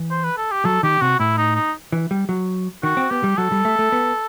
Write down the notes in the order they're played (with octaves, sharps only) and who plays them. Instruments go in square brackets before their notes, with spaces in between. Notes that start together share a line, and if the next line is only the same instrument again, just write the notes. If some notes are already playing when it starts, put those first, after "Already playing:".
Already playing: [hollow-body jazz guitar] E3
[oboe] C5
B4
A4
G4
[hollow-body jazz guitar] F#3 [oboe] A4
[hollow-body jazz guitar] D#3 [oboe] G4
[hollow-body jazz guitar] C3 [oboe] F#4
[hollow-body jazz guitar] A2 [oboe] E4
[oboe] D#4
D#4
[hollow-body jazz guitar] E3
G3
F#3
[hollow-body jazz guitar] D#3 [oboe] F#4
[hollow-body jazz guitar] C4
[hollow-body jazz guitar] B3 [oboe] G4
[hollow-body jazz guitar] G3
[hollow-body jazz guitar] F#3 [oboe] A4
[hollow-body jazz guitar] G3
A3
A3
B3